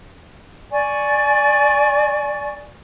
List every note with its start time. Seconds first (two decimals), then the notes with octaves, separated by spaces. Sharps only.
0.72 D5 G#5 C#6